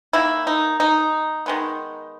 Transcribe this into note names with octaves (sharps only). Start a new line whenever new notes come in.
D#3 A#3 E4
D#4
D#4
D#3 G#3 B3